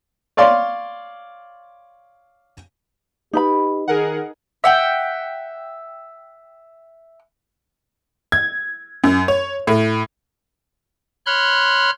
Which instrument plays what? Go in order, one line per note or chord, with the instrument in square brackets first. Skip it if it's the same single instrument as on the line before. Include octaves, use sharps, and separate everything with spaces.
[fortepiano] C#5 D5 F5 C6
[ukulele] D#4 B4 B5 [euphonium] G4
[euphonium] D#3 [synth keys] G#4 A#4 F#5
[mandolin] E5 F#5 G5
[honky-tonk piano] G#6
F#2
C#5
A2
[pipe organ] C#5 B5 C6 F6 F#6